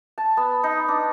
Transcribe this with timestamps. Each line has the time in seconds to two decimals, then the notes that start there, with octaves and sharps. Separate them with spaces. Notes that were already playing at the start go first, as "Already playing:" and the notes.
0.18 A5
0.37 B3
0.64 D#4
0.88 D4